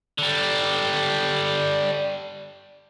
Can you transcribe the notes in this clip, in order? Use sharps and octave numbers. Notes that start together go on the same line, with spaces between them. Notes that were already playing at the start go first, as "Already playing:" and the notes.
D3 G3